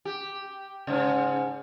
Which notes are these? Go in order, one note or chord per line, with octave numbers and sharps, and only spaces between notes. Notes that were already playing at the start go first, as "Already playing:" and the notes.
G4
G#2 C#3